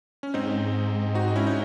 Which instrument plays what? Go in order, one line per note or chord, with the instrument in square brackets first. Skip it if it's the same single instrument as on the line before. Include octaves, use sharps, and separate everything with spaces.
[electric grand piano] C#4
[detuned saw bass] G#2 [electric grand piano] C4 D#4
[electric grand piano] D#4 F#4
C#4 E4
D#4